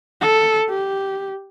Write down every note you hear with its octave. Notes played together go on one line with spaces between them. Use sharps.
A4
G4